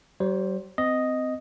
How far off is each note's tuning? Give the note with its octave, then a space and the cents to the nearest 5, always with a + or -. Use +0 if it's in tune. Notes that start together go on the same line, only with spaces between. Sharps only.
G3 -45 C5 +10
C4 -25 D#5 +0